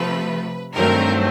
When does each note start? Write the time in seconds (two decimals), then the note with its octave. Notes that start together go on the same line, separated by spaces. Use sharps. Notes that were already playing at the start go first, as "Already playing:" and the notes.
Already playing: C3 F3 A3 B4
0.74 G2 D#3 F#3 A3 C4 A#4